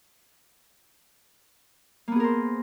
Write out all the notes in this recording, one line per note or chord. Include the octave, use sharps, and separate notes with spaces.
A#3 B3 G#4 A#4 C5